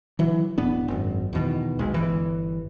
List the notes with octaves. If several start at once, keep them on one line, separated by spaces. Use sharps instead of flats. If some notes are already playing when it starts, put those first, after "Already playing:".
E3 F#3
E1 A2 B3 D4
G#1 F#2
E2 B2 D#3
B1 G#3
G1 E3